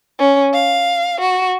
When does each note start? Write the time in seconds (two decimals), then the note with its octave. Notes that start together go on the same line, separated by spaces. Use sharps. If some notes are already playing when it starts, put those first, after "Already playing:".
0.18 C#4
0.53 F5
1.21 F#4